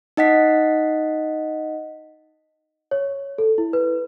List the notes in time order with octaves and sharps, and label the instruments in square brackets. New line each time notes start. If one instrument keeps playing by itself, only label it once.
[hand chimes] D#4 D#5 F#5 B6
[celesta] C#5
A4
E4
B4